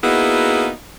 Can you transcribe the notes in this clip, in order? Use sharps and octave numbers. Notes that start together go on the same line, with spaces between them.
A#3 B3 D#4 E4 F#4 G#4